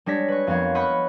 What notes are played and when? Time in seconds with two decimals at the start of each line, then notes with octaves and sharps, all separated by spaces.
0.06 G3 G#3 D4 C#5 A#6 B6
0.28 B4 C#6
0.47 F2 B3 A#4 C#5 F5
0.75 D#5 F#5 B5 C#6 G6 C#7